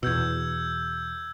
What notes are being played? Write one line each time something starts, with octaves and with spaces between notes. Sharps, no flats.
E2 B2 E6 G6 G#6